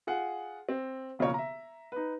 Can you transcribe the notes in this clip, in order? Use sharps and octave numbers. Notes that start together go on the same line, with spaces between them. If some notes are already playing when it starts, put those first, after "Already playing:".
F4 G#4 F#5
C4
E1 C#3 F3 A#3 C#5
E5 A#5
D#4 B4